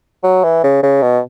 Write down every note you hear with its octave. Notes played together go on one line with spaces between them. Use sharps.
F#3
E3
C#3
C#3
B2